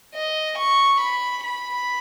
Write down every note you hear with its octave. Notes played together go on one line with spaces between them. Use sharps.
D#5
C#6
B5
B5